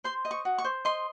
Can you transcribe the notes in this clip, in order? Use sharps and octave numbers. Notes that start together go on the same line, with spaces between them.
C5 C6
D#5
C#6
F#4
C#6
C5
D#5 C6